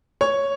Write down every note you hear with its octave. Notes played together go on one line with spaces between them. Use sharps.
C#5 C#6